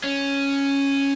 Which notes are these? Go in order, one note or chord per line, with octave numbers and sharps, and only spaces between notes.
C#4